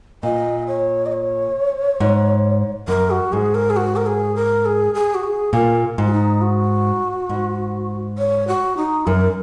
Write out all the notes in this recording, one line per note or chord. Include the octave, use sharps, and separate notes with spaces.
A#2 D#5
C#5
D#5
C#5
G#2
F#2 A#4
F#4
G#2 G#4
A#4
G#4
F#4
A#4
G#4
A#4
G#4
G#4
F#4
G#4
A#2 A#4
G#2
F#4
D#4
F#4
G#2
C#5
F#4
D#4
F#2 A#4